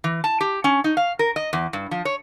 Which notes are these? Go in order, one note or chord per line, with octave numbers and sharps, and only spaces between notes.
E3
A5
G4
C#4
D#4
F5
A#4
D#5
E2
G2
F3
C#5